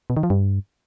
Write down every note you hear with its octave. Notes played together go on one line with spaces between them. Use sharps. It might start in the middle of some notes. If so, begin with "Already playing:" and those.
B2
D#3
F3
G2